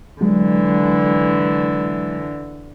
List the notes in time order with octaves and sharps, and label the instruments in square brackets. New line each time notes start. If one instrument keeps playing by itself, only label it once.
[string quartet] D3 E3 [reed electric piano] F#3 G#3